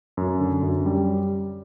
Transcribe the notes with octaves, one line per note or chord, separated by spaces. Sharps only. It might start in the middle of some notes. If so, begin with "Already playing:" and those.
F#2
D3
F#2
G3